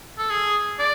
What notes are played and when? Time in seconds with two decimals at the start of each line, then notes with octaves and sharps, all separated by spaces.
0.18 A4
0.30 G#4
0.79 D5